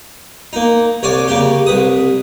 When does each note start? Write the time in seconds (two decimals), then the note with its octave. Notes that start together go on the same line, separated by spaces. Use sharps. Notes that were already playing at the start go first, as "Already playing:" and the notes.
0.53 A#3 D#4
1.03 C2 C#5 D5 G#5 D6
1.28 C#3 A#3 C#4 G4
1.66 C2 B4 D#6